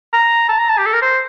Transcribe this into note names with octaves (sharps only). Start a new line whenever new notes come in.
A#5
A5
A#5
A5
G4
A4
A#4
C5